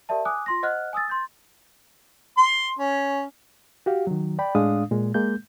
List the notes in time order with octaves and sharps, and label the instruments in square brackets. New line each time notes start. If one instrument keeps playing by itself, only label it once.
[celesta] G4 A#4 D5 E5 A5
G#5 D6 D#6 F#6
F4 C6 A#6
C5 D#5 F#5 F6 F#6
G#5 D#6 E6 A6
C6 G6 A6
[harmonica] C6
C#4
[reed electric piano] F#4 G4 F5
D#3 F#3
D5 G5 B5
A2 G#3 D4 F5 D#6
A#2 G#3
G#3 A#3 G6